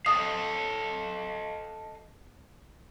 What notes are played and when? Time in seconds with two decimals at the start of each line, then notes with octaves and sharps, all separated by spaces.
0.06 A4 D#5 F5 D#6